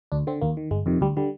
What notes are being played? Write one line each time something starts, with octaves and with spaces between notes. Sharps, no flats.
D2 D4
D3 C4
D#2 A#3
D#3
G1 G#3
F2 C3 D#3
D2 G3
D3 G3